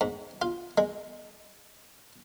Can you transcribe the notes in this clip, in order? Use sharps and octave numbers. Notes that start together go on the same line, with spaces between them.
G#2
F4
G#3